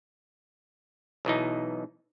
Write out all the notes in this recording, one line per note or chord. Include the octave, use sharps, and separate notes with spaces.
B1 B2 E3 D#4